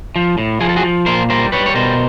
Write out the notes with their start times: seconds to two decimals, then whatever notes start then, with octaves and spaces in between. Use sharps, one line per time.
0.16 F3
0.38 A2
0.61 F3 G#4
0.69 A4
0.76 F#4 G#4
0.83 F3
1.06 A#2 A#4 C5
1.29 G3 A#4 C5
1.52 G3 B4 C#5
1.66 C#5
1.75 B2 A#4 C5